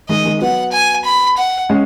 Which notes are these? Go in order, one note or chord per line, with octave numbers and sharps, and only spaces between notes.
D#3 G#3 D#5
D#3 G#3
F#3 B3 F#5
G#5
B5
F#5
G#3 C#4